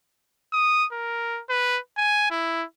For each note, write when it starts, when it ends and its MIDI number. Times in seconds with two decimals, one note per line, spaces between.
0.53 0.86 87
0.93 1.41 70
1.49 1.79 71
1.97 2.26 80
2.31 2.64 64